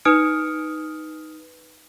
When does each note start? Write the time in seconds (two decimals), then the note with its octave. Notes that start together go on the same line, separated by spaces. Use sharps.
0.05 D#4 B4 D#6 F6 C#7 D7